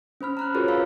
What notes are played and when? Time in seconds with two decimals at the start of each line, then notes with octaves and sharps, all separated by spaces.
0.21 C#4 C5 B5 F6
0.37 A#5 F6 F#6
0.54 F4 F#4 G#4 A#4 B4 C#5
0.68 F5 B5 E6 F6